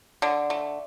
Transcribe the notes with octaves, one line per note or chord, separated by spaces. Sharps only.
D3
A3